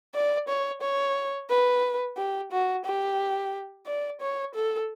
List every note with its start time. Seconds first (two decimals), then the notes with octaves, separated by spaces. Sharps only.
0.14 D5
0.48 C#5
0.82 C#5
1.50 B4
2.17 G4
2.52 F#4
2.85 G4
3.86 D5
4.21 C#5
4.55 A4